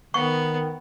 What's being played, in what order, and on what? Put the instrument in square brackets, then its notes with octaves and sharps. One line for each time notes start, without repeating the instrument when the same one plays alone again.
[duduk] D#3 [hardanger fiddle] B3 [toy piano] C#6